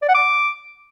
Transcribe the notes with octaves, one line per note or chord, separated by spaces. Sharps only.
D5
F#5
D6